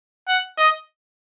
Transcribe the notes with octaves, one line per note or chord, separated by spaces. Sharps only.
F#5
D#5